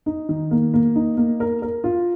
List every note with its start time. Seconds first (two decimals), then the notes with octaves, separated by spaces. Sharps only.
0.06 D#4
0.29 D#3
0.51 A#3
0.74 A#3
0.96 D#4
1.17 A#3
1.40 A#4
1.62 A#4
1.84 F4